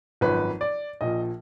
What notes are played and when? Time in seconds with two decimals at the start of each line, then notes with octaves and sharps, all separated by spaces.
0.21 G#1 F#2 F3 B4
0.61 D5
1.01 A#1 A#2 F3 D#5